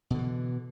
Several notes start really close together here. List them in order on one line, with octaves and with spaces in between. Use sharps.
B2 D3 E3